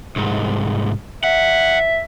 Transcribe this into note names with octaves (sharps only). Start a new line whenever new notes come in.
C2 G#2
E5 F#5